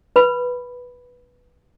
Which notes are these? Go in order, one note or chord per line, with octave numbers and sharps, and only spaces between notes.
B4 B5